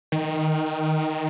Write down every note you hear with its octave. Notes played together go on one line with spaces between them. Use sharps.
D#3